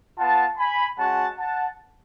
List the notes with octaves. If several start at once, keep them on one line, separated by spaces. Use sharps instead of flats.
B3 F4 F#5 A5
G#5 B5
G#3 C#4 F#4 F#5 A5
F#5 A5